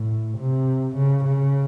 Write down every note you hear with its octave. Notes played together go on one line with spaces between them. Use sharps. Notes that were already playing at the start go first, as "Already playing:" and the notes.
Already playing: A2
C3
C#3
C#3